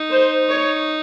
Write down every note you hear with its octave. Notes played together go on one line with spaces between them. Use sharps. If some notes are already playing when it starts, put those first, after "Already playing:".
Already playing: D#4
C5
C#5